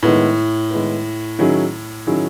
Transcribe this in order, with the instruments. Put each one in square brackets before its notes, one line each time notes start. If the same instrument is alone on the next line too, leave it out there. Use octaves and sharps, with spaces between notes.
[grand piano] A2 [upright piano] D#3 G#3 B3 E4 B4
[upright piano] D#3 G#3 B3 E4 B4
D#3 F#3 C#4 E4 G#4
D#3 F#3 C#4 E4 G#4